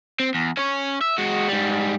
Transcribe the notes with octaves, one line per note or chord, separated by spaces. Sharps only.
C4
E2
C#4 C#5
E5
G#3 F#4
G#2 G3